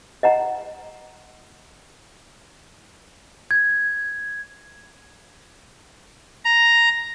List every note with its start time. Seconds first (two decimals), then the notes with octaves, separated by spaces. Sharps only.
0.23 D#5 F#5 A#5
3.51 G#6
6.45 A#5